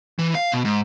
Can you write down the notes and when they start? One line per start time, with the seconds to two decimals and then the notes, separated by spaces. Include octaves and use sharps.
0.19 E3
0.35 F5
0.52 B2
0.65 G#2